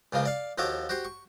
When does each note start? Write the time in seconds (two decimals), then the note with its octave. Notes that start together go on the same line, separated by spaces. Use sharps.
0.13 C#2 C#3 F3 A#3
0.26 D5 F5
0.58 D#2 F3 F#4 A4 C#5 D6
0.89 F#4 G4 C5 C#6
1.05 C#6